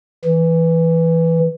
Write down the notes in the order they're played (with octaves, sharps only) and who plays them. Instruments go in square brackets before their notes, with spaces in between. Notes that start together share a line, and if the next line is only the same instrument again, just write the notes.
[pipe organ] E3